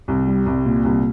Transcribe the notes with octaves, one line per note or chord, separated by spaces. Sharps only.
C2
G3
C2
A#2
C2